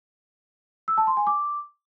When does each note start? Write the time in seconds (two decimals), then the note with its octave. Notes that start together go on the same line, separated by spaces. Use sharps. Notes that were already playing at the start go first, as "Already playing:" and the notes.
0.88 E6
0.98 A5
1.07 C6
1.17 G#5
1.27 D6